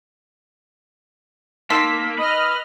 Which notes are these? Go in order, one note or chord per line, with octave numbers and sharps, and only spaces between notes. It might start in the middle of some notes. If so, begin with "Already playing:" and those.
D#3 A#3 A4 C6 E6 B6
B4 D#5 F6